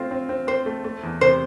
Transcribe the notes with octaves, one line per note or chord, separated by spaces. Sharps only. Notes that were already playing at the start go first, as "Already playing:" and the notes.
Already playing: A3 C4 F4 C5
C4
C4
C4 C5
A3
A3
E2
C3 C5